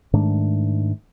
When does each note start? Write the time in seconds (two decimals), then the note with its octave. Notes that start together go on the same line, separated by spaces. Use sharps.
0.13 G#2 D#3 A3 D4